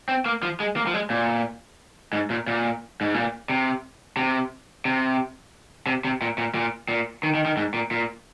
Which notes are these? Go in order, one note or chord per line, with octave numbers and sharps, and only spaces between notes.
C4
A#3
F3
G#3
A#3
F3
G#3
A#2
G#2
A#2
A#2
G#2
A#2
C3
C3
C3
C3
C3
A#2
A#2
A#2
A#2
D#3
D#3
D#3
G#2
A#2
A#2